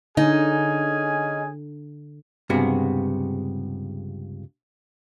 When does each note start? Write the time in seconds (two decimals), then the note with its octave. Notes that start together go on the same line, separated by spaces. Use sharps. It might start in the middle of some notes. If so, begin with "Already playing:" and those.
0.17 D3 C#4 D#4 G#4 G#5
2.50 C#2 G2 C3 B3 F#4 G#4